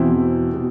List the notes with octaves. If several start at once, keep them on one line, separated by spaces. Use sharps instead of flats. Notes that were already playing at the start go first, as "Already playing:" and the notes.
Already playing: E2 B2 C4 E4
B2